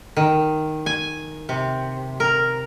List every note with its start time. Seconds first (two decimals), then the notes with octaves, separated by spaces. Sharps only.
0.17 D#3
0.86 G#5
1.49 C3
2.20 A#4